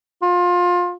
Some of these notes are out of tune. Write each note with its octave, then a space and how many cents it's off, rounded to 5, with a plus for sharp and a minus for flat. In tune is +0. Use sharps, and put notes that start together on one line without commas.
F4 +25